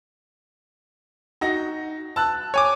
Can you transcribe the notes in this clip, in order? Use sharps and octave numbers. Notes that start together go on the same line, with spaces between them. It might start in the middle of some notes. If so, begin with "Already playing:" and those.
D#4 F#4 A#6
A5 E6 F#6
C#5 G#5 D6